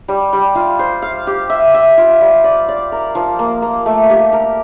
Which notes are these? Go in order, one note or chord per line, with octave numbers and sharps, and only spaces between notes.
G3
G3
F4
C5
F5
G4
E5
E5
F4
G3
D5
D5
A#4
F3
A#3
A#3
A3
G4
A#4